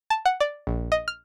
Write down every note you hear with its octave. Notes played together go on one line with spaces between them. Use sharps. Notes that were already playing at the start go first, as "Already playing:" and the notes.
A5
F#5
D5
A#1
D#5
F6